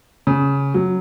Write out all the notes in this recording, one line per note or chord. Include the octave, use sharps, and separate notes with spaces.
C#3
F#3